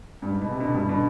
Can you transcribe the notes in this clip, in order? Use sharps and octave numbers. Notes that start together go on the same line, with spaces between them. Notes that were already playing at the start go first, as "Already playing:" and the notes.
G2
G#2
B2
C3
B2 D3
C3
G2 B2
B2 D3